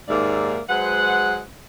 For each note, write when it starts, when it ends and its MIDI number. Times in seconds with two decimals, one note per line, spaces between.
0.09 0.60 39
0.09 0.60 44
0.09 0.60 56
0.09 0.60 58
0.09 0.60 74
0.09 0.60 76
0.70 1.41 54
0.70 1.41 56
0.70 1.41 71
0.70 1.41 72
0.70 1.41 78